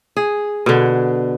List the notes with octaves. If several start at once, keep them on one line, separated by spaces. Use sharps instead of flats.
G#4
B2 D3